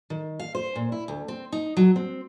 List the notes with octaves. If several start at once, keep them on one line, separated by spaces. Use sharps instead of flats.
D#3
F5
C5
A#2
E4
D2
C4
D#4
F#3
C4